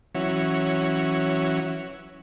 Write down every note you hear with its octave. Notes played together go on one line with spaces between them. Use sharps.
E3 F#3 C#4